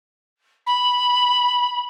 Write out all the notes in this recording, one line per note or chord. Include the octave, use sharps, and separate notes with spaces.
B5